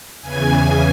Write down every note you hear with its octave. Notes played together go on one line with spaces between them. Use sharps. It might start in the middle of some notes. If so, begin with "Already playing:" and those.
E2 C#3 E3 G#5